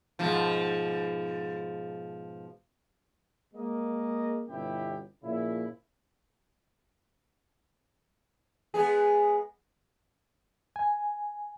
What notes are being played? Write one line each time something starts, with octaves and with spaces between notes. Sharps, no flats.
G#2 B2 F3
G#3 A#3 D#5
G1 B2 C#4 E4 G4 G5
A#2 C#3 F3 E4
G#3 B3 G#4
G#5